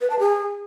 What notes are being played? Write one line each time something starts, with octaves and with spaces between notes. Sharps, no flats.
B4
A5
G#4